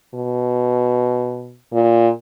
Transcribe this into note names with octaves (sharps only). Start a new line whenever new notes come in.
B2
A#2